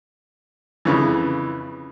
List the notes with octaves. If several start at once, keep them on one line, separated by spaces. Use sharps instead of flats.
F2 C#3 E3